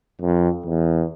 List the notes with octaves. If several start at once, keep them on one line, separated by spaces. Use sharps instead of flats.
F2
E2